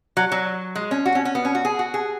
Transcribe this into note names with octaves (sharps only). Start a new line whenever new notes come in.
F#3
F#3
G#3
C#4
F#4
C#4
C#4
B3
C#4
F#4
G#4
F#4
G#4